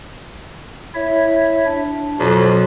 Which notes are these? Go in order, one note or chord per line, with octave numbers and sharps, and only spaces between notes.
E4 C#5 E5
D4
F2 B2 F#3